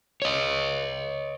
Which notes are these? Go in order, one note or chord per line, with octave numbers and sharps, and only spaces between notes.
C#5 D#5